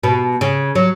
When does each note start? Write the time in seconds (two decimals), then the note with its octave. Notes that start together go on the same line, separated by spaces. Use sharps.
0.03 B2
0.41 C#3
0.75 F#3